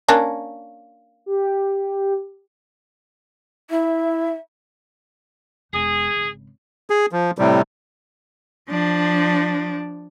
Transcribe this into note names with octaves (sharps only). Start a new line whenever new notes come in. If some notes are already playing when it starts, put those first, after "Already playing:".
A#3 C#4 D4
G4
E4 E5
E1 D#4 G#4
G#1 C#3
G#4
F3
A2 C3 G3
F3 D4